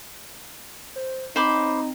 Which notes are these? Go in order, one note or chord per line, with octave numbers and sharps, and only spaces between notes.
C5
C4 D#4 C5 B5 D6